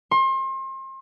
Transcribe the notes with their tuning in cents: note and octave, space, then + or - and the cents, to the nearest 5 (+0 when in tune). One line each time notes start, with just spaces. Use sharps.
C6 +35